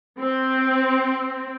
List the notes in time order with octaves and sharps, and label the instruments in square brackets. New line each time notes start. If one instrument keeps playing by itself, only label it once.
[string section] C4